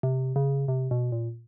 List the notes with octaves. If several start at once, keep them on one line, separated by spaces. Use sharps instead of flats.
C3
C#3
C3
B2
A#2